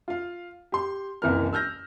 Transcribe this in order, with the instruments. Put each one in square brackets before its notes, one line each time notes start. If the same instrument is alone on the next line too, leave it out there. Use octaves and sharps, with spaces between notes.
[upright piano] F4 F5
G4 C6
F#1 C2 E3 A#4 F6
E6 F6 G6 A#6